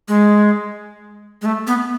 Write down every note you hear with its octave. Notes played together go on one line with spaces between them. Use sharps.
G#3
G#3
A3
B3